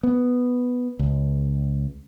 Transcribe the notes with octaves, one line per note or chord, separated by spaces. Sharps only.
B3
C#2